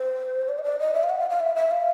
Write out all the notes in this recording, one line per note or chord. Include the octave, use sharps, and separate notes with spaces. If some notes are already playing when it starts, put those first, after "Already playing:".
Already playing: C5
D5
D#5
D5
D#5
E5
F5
F#5
F5
F5
E5
E5
F5